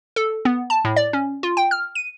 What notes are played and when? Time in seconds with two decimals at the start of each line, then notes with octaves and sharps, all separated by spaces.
0.16 A4
0.45 B3
0.70 A5
0.85 A2
0.96 D5
1.13 C#4
1.43 F4
1.57 G5
1.71 F6
1.95 D#7